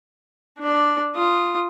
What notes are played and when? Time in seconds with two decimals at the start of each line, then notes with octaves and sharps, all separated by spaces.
0.59 D4 D5
1.15 F4 D#6